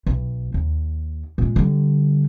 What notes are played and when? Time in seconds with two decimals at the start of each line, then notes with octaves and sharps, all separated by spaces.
0.06 B1
0.54 D#2
1.38 A#2 G#3
1.56 D3 G3